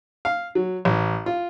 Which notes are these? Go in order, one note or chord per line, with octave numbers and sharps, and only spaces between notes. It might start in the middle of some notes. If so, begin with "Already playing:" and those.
F5
F#3
A1
F4